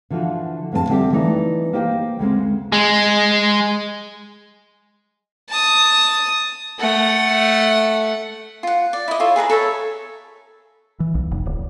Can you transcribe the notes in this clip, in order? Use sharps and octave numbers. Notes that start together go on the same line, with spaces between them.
D3 E3 F3 F4 F#4
F2 A2 C4 B4 A5
D3 G3 C4 G4 E5 G5
E3 A3 D#4 E4 D5 D#5
A#3 G4 C5 D#5 G5
D2 C#3 G#3 C4
G#3
A5 D#6
A3 F#5
F4 F#5
D5
E4 D#5
F4 A4 C#5
G#4 B4 A5 A#5
A4 A#4 C#5 E5
E3
B1
F1
D1